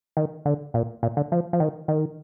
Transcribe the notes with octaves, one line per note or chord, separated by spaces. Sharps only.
D#3
D3
A#2
A#2
D3
F3
F3
D#3
D#3